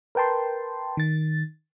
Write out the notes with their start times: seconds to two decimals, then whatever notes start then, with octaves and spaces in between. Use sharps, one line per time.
0.15 A#4 B4 G5 A5 C6
0.97 D#3 A6